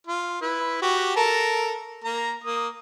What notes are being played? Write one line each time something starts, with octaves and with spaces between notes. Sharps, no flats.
F4
E4 B4
F#4 G4
A4 A#4 A5
A#3 A#5
A#3 D#6